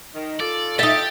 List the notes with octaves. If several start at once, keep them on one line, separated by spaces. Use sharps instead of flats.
D#3
F4 A4 D5
D#4 G4 E5 A6